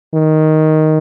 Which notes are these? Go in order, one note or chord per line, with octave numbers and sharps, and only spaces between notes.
D#3